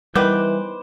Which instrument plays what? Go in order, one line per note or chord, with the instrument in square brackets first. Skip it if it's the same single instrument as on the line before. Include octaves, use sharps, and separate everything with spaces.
[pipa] D#3 B3 B4 [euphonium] E3 [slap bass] G3 [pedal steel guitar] C5 D6 G6